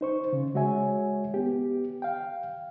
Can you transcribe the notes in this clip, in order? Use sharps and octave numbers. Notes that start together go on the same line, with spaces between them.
D#4 C5 C#6
C#3
G#3 F#4 C#5 E5 G#5
B3 G4
F5 G5